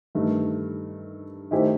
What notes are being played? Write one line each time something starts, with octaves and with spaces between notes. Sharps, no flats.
G2 D#3 A3
D#3 A3 E4 G4 C5